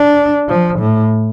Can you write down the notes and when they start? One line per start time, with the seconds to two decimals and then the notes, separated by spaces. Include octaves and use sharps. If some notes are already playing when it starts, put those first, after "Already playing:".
Already playing: D4
0.49 F3
0.79 A2